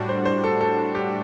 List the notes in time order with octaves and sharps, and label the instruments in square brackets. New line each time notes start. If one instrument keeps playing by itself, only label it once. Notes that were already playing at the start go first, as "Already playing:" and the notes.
Already playing: [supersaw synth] A2 G3 D4 F#4
[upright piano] C5
C5
A4
A4
G4